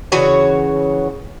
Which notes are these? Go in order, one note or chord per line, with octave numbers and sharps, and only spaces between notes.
C#3 E3 F#4 C#5